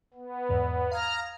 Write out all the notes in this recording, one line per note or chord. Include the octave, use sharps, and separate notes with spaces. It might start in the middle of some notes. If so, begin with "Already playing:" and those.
B3
E2 G#2
F5 A#5 D#6 F6 G#6